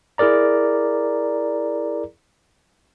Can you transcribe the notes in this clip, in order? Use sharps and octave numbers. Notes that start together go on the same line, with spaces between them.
E4 G#4 A#4 D5 A#5